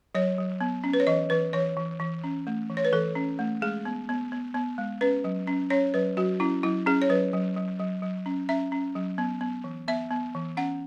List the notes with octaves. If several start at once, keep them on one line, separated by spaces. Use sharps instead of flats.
F#3 C#5
F#3
B3
C#4
B4
C#5
E3 D#5
E3 B4
E3 C#5
E3
E3
C#4
A3
E3
C#5
B4
E3 A4
C#4
A3
G#3 G#4
B3
B3
B3
B3
G#3
C#4 B4
F#3
C#4
C#4 C#5
F#3 B4
F#3 F#4
C#4 E4
F#3 E4
C#4 G#4
C#5
F#3 B4
F#3
F#3
F#3
F#3
C#4
C#4 E5
C#4
F#3
B3
B3
E3
B3 E5
B3
E3
C#4 F#5